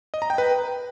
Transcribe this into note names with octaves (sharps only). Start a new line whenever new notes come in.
D#5
A#5
G5
B4